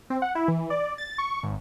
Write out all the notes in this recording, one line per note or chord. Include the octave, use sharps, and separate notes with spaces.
C4
F#5
E4
E3
D5
A6
C#6
G#1